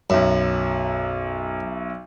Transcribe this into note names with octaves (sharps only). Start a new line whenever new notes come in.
B1 F#2 E5